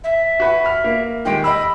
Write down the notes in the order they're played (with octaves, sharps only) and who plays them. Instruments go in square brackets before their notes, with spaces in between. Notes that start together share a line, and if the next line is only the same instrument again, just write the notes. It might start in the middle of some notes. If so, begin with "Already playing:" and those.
[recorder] E5
[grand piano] F#4 B4 F#5
B5 F6
A#3
[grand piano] D#3 G#3 G4 [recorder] G5
[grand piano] D#5 E6 [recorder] B5